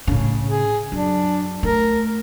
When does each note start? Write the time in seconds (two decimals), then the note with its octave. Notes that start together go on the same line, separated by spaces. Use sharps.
0.07 A2 C#3
0.48 G#4
0.92 F#2 D4
1.63 A3 A#4